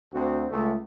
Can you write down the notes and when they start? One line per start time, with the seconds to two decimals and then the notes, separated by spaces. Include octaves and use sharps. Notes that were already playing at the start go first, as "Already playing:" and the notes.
0.13 D2 C4 F#4
0.51 C#2 A3